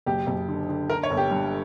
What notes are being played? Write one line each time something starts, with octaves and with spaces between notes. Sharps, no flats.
F#1 G4
F#1
D3
D3
D3 A#4
C#5
G1
G4
G2